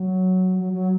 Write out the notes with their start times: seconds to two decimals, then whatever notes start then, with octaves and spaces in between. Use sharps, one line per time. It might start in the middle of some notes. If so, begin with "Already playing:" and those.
Already playing: F#3
0.59 F#3
0.73 F#3